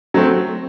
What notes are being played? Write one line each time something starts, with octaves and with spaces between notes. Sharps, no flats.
F#3 A3 C4